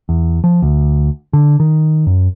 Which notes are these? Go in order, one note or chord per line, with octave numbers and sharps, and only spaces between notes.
E2
F3
D2
D3
D#3
F#2